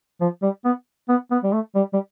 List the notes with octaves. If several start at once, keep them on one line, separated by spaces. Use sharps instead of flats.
F3
G3
B3
B3
B3
G3
A3
G3
G3